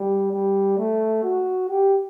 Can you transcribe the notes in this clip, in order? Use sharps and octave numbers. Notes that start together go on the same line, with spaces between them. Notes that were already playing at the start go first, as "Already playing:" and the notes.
Already playing: G3
G3
A3
F#4
G4